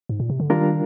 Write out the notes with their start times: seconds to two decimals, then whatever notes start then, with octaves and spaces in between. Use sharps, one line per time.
0.09 G#2
0.20 A#2
0.30 C3
0.40 D3
0.50 D#3 G3 D4 F4 A#4